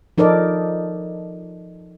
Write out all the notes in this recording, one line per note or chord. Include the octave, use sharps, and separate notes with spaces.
F3 D#4 A4 A#4 D5